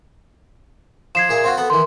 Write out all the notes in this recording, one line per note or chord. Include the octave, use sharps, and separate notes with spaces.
F3 G#6 C7 E7
A#2 G#4 E5
C4 F4 F#4
B3 A4 B5
D#3 E3 C6